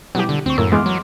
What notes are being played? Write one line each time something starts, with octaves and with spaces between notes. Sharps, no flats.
B2 F#3 G3 B3 E4 G4
D3
D2 C4 C#6
F#2 A2 A#3 A#4 C#5 E6
E3 G#3 B3 C6 D6 F6
F#3